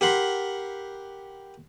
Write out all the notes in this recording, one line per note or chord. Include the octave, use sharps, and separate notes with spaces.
G4 A#4 F#5 B5 C6